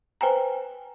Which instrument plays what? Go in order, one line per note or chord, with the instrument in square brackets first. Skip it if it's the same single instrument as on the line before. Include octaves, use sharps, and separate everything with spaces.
[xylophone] B4 C5 G5 G#5 A#5